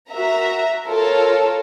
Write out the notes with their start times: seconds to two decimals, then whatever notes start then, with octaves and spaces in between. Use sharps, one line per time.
0.11 F#4 A#4 E5 A#5
0.86 F4 A4 A#4 C#5